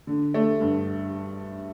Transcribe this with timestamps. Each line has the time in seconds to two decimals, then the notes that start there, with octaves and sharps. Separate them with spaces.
0.07 D3
0.34 A3
0.61 G2